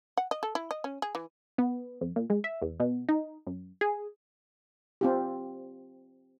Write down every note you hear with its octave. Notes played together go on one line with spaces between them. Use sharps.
F#5
D#5
A4
E4
D#5
C#4
G#4
E3
B3
F2
A#2
G#3
E5
E2
B2
D#4
F#2
G#4
C4 F4 G4